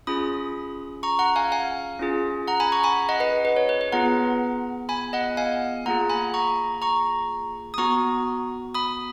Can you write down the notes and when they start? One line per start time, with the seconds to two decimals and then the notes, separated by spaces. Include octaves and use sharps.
0.07 C#4 F4 G#4 B5 D#6
1.03 A#5 C#6
1.19 F#5 A#5
1.36 F5 G#5
1.52 F5 G#5
1.99 C#4 F4 G#4
2.48 F#5 A#5
2.60 G#5 B5
2.72 A#5 C#6
2.84 G#5 B5
3.09 D#5 F#5
3.20 B4 D#5
3.45 B4
3.56 C#5
3.69 B4
3.81 B4
3.92 B3 F4 G#4 F#5 A#5
4.89 G#5 B5
5.13 D#5 F#5
5.37 F5 G#5
5.86 A#3 F4 G#4 F#5 A#5
6.10 G#5 B5
6.34 A#5 C#6
6.82 A#5 C#6
7.74 D#6
7.78 B3 F#4 A#5 C#6
8.74 B5 D#6